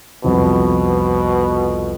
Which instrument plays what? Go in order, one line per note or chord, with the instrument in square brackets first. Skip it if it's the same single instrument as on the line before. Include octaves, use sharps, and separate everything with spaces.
[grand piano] C2 F2 [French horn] B2